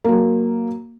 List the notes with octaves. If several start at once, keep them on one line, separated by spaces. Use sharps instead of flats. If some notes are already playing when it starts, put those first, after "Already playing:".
F#3 A#3